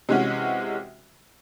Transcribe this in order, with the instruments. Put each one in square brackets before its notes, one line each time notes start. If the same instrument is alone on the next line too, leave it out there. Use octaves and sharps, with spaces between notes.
[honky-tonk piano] C3 E3 G#3 C#4 F#4